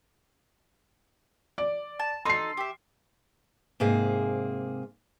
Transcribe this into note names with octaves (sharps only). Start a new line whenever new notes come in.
D5
A5
D#4 A4 C6 C7
G4 E5
G#2 C3 A#3 G#4